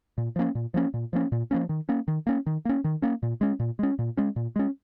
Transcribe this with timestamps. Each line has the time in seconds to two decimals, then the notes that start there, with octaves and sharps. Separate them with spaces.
0.18 A#2
0.36 F3 A#3 C#4
0.55 A#2
0.74 F3 A#3 C#4
0.94 A#2
1.13 F3 A#3 C#4
1.32 A#2
1.51 F3 A#3 C#4
1.69 D#3
1.89 A#3 C#4
2.08 D#3
2.27 A#3 C#4
2.46 D#3
2.65 A#3 C#4
2.84 D#3
3.02 A#3 C#4
3.23 A#2
3.41 G#3 C#4
3.60 A#2
3.79 G#3 C#4
3.99 A#2
4.17 G#3 C#4
4.36 A#2
4.56 G#3 C#4